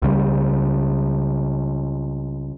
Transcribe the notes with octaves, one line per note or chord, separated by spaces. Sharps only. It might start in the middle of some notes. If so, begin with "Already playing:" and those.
C#2 C#3 G3